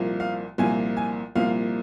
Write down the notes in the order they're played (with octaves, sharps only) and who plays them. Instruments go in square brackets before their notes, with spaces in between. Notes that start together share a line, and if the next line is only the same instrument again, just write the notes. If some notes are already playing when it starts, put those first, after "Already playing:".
Already playing: [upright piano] C2 A#2 F3 A#3
F5
C2 A#2 F3 A#3 G#5
G#5
C2 A#2 F3 A#3 F5